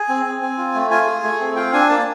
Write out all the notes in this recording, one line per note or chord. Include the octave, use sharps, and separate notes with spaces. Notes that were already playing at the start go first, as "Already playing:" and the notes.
Already playing: G#4 G#5
C4
C4
C4
F4
A3
F4 G#5
G#4
A3
C4
F4 G5
D4 G#5
A#3 A5